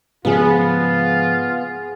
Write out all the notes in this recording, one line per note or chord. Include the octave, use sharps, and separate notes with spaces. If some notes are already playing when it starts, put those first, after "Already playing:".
G#2 C#3 F3 B3 F4 G#4 F5